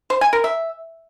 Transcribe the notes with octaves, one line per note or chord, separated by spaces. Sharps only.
C5
G#5
A#4
E5